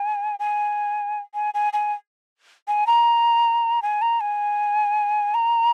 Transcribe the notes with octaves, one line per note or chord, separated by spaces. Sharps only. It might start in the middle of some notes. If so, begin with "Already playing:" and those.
Already playing: G#5
G#5
G#5
G#5
G#5
G#5
A#5
G#5
A#5
G#5
A#5